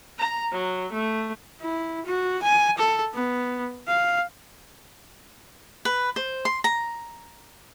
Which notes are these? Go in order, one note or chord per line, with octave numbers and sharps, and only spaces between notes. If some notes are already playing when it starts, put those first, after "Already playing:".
A#5
F#3
A3
E4
F#4
G#5
A4
B3
F5
B4
C5
C6
A#5